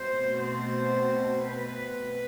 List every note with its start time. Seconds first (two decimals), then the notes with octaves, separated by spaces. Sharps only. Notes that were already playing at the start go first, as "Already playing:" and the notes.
Already playing: B2 A3 C4 C5
0.37 C5
1.46 B4